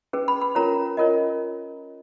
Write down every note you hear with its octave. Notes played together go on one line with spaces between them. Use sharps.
C#4 G#4 B4
B5
B5
C#4 F4 A#4 C#5 A#5
C#4 F4 A#4 C#5 D#5